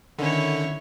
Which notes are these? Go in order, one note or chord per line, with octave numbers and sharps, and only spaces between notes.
D3 D#3 C#4 E4 C#5